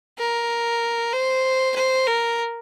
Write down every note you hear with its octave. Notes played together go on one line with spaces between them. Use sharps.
A#4
C5
C5
A#4